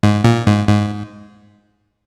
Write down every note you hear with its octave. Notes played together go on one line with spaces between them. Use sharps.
G#2
A#2
G#2
G#2